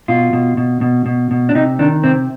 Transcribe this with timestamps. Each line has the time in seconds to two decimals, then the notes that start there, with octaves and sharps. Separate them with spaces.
0.08 B2 F4
0.33 B2
0.57 B2
0.81 B2
1.06 B2
1.31 B2
1.49 D4
1.55 C3 D#4
1.79 D#3 D4
2.04 C3 C4